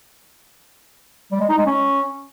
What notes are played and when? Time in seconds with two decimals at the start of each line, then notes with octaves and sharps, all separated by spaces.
1.32 G3
1.40 G#3
1.49 D#4
1.58 G#3
1.66 C#4